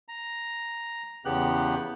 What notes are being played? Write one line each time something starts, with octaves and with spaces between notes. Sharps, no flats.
A#5
E2 C#3 B3 G4 F#6